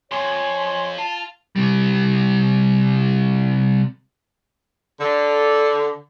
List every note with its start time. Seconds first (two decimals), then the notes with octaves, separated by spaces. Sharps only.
0.12 F2 C#5 G#5 C6
0.98 F4 A5
1.56 C3 G3
5.00 D3